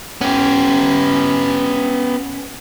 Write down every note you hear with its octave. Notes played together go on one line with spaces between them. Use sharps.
B3 C#4 G4